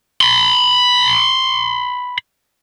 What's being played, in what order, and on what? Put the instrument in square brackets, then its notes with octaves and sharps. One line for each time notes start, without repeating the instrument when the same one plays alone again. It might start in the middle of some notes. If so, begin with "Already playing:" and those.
[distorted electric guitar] B5 C6